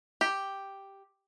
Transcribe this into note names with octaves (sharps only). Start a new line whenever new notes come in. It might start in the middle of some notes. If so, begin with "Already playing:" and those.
G4